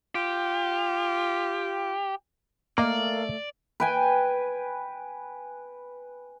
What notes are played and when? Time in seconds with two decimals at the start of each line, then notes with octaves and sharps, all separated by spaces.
0.15 F4 G4
2.78 A3 A#3 A#4 D5 D#5 F5
3.80 B4 G5 G#5